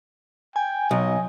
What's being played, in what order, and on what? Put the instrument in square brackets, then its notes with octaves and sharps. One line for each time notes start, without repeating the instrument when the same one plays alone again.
[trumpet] G5 [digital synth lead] G#5
[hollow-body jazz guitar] B1 [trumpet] D#5